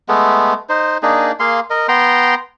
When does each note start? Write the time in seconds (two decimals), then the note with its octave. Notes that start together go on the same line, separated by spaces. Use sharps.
0.09 G#3 A3 B3
0.69 D#4 C5
1.03 A#3 D4 D#4 G#4
1.40 A#3 G#4 F5 C6
1.70 A#4 D#5
1.88 B3 G5 A#5 C6